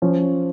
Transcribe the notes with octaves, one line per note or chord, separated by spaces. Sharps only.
F3 C#4